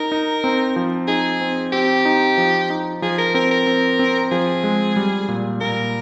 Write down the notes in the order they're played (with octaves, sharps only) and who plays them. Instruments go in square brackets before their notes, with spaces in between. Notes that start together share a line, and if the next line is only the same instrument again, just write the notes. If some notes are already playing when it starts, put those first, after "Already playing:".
Already playing: [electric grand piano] D#4 [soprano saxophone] A#4
[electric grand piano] D#4
C4
F3
[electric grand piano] D#4 [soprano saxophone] G#4
[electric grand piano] C4
[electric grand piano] C4 [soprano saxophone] G4
[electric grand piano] D#4
F3
D#4
[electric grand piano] F3 [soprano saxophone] G#4
[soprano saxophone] A#4
[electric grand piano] C4 [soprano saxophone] A#4
[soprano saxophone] A#4
[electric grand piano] C4
C4
[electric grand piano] F3 [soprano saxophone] G#4
[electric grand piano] G#3
G3
A#2
[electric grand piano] A#2 [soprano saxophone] A#4